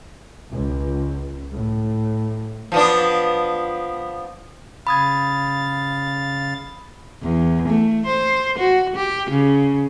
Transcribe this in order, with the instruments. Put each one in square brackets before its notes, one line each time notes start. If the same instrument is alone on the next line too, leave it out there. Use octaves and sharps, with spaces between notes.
[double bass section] C#2
A2
[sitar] F3 B3 D4
[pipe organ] C#3 F5 A6 [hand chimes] B5 D#6 G#6
[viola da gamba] E2
A3
C5
F#4
G4
C#3